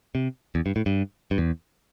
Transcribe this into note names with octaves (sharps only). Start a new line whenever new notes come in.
C3
E2
G2
A2
G2
G2
E2